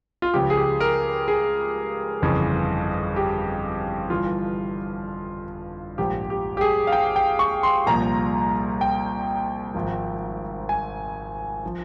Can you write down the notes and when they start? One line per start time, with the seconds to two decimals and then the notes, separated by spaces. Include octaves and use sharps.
0.22 F4
0.34 C#2 C#3 F3 G4
0.50 G#4
0.57 G4
0.80 A#4
1.28 G#4
2.22 G1 F2 C#3 E3
3.16 G4
4.10 G1 G2 E3 F4
5.98 A#1 G#2 F3 G4
6.30 G4
6.57 G4
6.61 G#4
6.87 F5
6.92 G5
7.16 G5
7.39 C#6
7.63 C6
7.87 C2 A#2 F3 A#5
8.81 G5
9.75 G#1 G#2 F3
10.69 G#5
11.66 F3